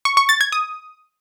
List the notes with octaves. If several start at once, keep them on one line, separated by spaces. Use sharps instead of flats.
C#6
C#6
A6
G#6
D#6